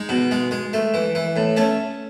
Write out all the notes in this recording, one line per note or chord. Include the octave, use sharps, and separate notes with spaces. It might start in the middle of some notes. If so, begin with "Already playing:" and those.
Already playing: G#3 D#4
B2
G#3
G#3
A3
E3
E3
A2
A3 C#4